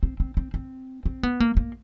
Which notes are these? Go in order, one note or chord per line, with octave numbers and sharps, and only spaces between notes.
C4
C4
C4
C4
C4
B3
A#3
A#3